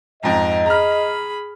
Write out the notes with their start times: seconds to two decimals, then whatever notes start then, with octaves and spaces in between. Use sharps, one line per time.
0.23 F2 G#2 D#5 A#5
0.66 G#4 A#5 B5 F6